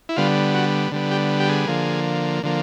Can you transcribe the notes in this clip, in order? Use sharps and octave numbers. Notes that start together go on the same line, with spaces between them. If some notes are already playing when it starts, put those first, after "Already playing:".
E4
D3 G3 B3 F4
F#4
D3 G3 B3
G4
G4
G#4
D3 F3 A#3
D3 F3 A#3